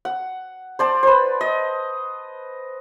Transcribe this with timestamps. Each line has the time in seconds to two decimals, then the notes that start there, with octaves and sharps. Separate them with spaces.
0.05 F#5
0.79 C5 D5 A5
1.03 B4 C5
1.41 D#5